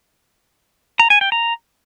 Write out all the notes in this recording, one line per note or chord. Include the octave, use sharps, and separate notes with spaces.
A#5
G#5
G5
A#5